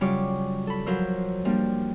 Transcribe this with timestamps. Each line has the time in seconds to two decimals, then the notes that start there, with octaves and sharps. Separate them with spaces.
0.01 C#3 F#3 G3 F4 C#6 D6
0.67 A4 B5
0.86 F3 F#3 A#4 C5 E6
1.45 F3 G3 A#3 D4